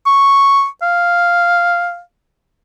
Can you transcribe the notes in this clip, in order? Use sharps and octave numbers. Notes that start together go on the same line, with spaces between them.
C#6
F5